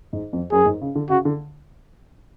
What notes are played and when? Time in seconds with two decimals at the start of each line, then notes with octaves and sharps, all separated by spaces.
0.13 G#2
0.33 F2
0.52 F#2 G#4
0.66 G#2
0.81 C#3
0.95 D3
1.09 C#3 F#4
1.25 D3